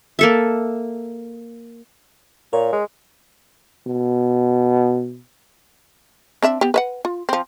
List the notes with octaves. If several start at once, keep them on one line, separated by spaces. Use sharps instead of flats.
A#3 A4 E5
A#2 A#4 C#5
G#3
B2
C4 D4 E5
B3 G4
B4 E5 F#5
F4
F3 C4